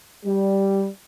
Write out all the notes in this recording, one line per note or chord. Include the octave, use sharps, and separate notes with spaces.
G3